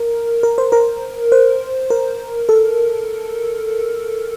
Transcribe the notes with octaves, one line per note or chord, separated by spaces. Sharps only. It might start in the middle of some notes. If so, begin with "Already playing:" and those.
Already playing: A#4
A#4
C5
A#4
C5
A#4
A4